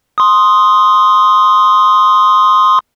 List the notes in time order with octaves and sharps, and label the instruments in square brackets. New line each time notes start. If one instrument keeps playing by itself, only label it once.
[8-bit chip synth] C6 D#6